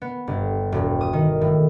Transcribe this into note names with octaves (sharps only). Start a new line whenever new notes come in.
B3
G1
E1
D#6
D#3
A2